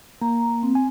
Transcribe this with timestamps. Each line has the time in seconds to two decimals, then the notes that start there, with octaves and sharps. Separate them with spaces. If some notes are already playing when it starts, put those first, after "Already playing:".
0.22 A#3 A#5
0.63 C4
0.75 G#5